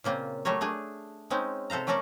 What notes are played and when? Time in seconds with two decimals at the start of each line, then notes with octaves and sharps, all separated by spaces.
0.04 A#2 C#3 A#3 C4 F4
0.45 F#3 G3 A3 A#4 C#5
0.61 A3 D4 G#4
1.30 G#3 C4 C#4 D#4
1.70 C3 A4 C5 F5 A#5
1.87 F#3 A3 C#4 A4 A#4 D5